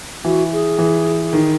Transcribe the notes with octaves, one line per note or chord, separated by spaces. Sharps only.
E3 F#4
G#4
E3
D#3